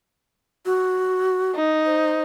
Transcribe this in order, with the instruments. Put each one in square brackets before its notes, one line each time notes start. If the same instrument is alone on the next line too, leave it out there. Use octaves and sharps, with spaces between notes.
[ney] F#4
[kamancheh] D#4
[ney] C5